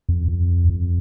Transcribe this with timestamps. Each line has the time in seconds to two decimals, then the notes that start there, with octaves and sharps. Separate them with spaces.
0.09 F2
0.28 F2
0.69 F2